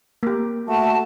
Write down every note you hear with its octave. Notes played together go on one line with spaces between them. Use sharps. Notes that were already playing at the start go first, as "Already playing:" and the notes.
A#3 G4
A3 F#4 A5